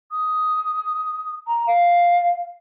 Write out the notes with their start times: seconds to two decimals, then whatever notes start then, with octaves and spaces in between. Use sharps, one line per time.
0.11 D#6
1.47 A#5
1.67 F5